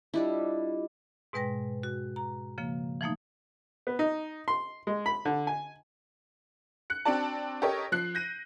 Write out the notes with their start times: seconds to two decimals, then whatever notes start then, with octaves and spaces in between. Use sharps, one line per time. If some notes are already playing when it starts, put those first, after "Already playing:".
0.14 G3 D4 E4 F4 G4 D#5
1.33 G#2 B2 G#3 B4 G5 A#6
1.83 F#4
2.16 A#5
2.58 C#3 F3 A#3
3.01 E3 F3 A3 A#3 D#4
3.87 B3
3.99 D#4
4.48 C6
4.87 G#3
5.06 B5
5.25 D3
5.47 G#5
6.90 F#6 C#7
7.05 C4 D4 F#4 D5 A5
7.62 G4 A4 A#4 C#5 D#5
7.92 F3 F#6 C7
8.15 G6 A#6 D#7